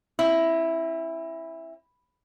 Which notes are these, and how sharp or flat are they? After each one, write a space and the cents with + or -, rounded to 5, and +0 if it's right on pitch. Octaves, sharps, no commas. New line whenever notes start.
C4 +45 E4 +0